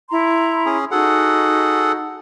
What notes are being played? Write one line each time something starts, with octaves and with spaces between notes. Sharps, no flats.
E4 A#5 C6
C#4 G#4
D#4 F#4 G#4 A4 F#5